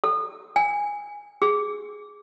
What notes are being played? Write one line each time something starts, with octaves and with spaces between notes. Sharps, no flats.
A4
G#5
G#4